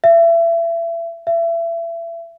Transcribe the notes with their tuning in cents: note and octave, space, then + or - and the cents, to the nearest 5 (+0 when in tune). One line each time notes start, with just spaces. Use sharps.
E5 +30
E5 +30